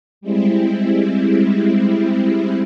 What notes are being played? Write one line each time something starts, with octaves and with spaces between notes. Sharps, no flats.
G3 G#3 C4 E4